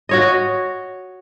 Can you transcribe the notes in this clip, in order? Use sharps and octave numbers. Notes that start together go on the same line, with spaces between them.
F#4 C#5 D#5